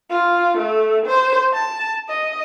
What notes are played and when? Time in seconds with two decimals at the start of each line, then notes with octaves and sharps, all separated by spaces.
0.11 F4
0.58 A3
1.06 C5
1.54 A5
2.09 D#5